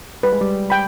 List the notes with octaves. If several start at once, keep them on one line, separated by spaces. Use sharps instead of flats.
G3 B4
G#3
G3
G5 B5